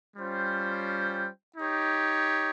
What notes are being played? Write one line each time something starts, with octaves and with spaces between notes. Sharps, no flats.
G3 C#4 F4 C5 G5
D#4 G4 C#5